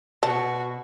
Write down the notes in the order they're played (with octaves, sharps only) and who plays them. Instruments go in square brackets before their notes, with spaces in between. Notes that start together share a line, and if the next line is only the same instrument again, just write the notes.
[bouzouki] B2 [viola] F#4 [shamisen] A5